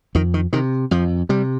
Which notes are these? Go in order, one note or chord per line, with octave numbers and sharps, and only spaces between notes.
F2 D#3
D#3
C3 D#3
F2 F3
C3 G3